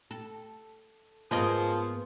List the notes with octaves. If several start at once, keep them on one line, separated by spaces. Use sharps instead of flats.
A4
G#2 F3 A#3 B3 G#4 A#4 D#5